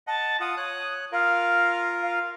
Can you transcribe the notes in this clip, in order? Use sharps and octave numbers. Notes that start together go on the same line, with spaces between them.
D#5 F#5 A5
F4 F#5 D#6
C#5 F#6
F4 A#4 F5
F5